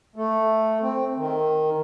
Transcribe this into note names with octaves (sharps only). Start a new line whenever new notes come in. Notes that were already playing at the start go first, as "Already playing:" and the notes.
A3
C4
D#3